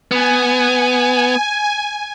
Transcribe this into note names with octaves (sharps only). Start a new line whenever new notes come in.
B3 G#5